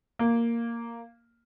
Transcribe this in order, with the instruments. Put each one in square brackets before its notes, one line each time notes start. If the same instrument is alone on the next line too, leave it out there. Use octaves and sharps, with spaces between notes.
[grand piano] A#3